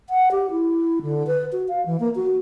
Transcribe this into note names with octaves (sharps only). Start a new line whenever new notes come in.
F#5
G4
E4
D3
B4
F#4
F5
E3
A#3
F#4